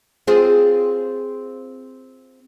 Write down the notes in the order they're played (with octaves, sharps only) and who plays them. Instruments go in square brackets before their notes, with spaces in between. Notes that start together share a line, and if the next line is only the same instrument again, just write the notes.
[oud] C4 F4 G#4